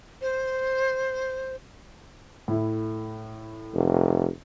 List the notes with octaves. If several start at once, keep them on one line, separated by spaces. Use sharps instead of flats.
C5
A2 E4
F1